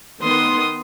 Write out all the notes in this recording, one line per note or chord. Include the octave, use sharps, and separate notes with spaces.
D#3 B3 C6 D#6